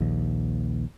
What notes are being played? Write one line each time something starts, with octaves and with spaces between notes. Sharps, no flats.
A#1 D#2